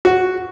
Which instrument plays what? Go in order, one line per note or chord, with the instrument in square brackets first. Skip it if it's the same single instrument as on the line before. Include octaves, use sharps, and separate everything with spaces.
[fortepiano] F#4